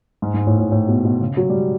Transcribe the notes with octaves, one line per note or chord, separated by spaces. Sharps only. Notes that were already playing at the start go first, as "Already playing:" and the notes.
G#2
G#2
A2
A2
A2
B2
B2
C#3
F#3
G3
G#3